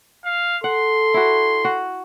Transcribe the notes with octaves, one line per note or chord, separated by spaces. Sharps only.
F5
A4 F#5 C6
E4 F#4
F#4